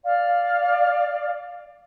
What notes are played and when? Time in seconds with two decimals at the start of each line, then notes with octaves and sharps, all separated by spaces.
0.04 D5 F5